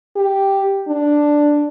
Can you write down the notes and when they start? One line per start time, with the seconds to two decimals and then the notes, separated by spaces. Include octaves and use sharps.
0.16 G4
0.88 D4